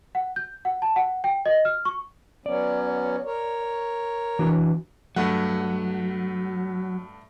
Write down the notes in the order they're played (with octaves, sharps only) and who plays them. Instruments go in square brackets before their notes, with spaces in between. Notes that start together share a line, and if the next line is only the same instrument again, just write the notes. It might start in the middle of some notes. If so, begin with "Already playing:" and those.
[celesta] F#5
G6
F#5
A5
F#5
G5
D#5
F6
C#6
[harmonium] F#3 B3 C#4 [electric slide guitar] D5
[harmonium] A#4 C#5
[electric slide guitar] E3 D4 F#4
[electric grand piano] G2 A3 F#5 [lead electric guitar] F#3